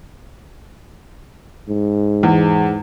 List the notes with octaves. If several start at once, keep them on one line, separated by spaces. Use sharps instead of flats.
G#2
E2